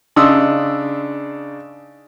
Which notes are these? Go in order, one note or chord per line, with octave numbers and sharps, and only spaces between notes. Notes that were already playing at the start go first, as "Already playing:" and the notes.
C#3 D4 D#4 C6 D#6 E6